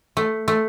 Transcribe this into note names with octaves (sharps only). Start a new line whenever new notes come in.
A3
A3